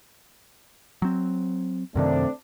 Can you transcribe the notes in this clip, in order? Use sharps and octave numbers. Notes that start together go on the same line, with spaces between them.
F#3 C4
F#2 C3 D#3 A3 C4 D4